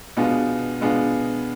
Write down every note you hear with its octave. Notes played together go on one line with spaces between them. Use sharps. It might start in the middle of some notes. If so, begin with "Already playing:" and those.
B2 G#3 B3 D4 F4
B2 G#3 B3 D4 F4